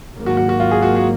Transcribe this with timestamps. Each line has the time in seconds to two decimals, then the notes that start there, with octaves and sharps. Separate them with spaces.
0.15 G#1 G#2 F#3 A#3
0.26 F#4
0.37 F#4
0.49 F#4
0.60 F4
0.71 G#4
0.82 F#4
0.96 F#4